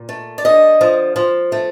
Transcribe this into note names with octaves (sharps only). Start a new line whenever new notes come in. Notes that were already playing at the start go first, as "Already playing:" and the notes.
Already playing: A#2
A3
D5
D3 D#5
F3
F3
A3